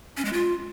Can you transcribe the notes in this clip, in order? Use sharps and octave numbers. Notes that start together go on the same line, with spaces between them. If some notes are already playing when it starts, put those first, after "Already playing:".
C#4
G#3
F4